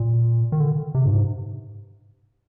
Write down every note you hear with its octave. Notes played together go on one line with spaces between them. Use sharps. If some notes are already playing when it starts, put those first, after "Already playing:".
Already playing: A#2
D#3
D3
C3
G2
G#2